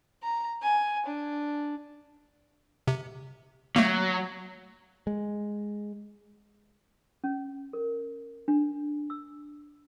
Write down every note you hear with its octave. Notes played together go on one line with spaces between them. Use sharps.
A#5
G#5
D4
C3
F#3 A3 A#3
G#3
C#4
A#4
D4
E6